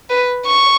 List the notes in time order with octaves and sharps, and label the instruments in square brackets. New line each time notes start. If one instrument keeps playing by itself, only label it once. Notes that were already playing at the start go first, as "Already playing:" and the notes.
[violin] B4
C#6